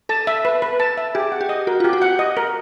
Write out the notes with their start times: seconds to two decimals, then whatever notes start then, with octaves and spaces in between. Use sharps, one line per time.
0.09 A4 A5
0.27 E5
0.45 B4
0.62 B4
0.80 A5
0.97 E5
1.15 G4 G#4
1.32 F#5
1.41 G4
1.49 D#5
1.67 F#4 A#4
1.80 F4 G4
1.93 F#4
2.02 F#5
2.19 D#5
2.37 A#4